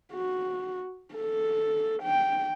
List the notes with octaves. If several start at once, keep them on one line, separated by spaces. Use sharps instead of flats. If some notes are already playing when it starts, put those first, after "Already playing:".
F#4
A4
G5